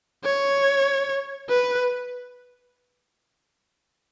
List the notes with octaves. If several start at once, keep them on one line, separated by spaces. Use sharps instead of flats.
C#5
B4